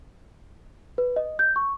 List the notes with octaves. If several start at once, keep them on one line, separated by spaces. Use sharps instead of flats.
B4
D#5
G6
C#6